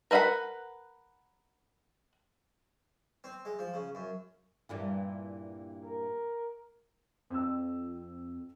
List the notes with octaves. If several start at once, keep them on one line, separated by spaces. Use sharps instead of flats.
A#4 B4 E5 F#5 B5
C4
G#3
F3
C#3
F#2
G2 A#2 E3
A#4
F2 C4 E6